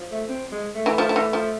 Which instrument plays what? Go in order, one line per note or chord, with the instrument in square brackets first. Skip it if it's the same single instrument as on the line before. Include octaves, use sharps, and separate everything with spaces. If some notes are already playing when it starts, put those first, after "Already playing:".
Already playing: [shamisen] F3
[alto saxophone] A3
C4
G#3
A3
[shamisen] E3
F3
F3
E3
F3